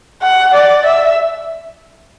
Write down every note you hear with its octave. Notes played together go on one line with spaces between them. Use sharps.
F#5
D5
E5